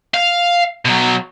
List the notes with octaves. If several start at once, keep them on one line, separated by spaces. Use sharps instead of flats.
F5
B2 F#3